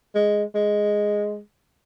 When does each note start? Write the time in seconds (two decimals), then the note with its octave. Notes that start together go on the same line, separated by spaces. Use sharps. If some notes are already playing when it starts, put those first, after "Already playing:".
0.15 G#3
0.55 G#3